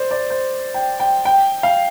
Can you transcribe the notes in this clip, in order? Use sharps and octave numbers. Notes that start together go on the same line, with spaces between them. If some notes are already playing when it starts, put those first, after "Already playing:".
Already playing: C5 D5
D5
C5
G5
G5
G5
F5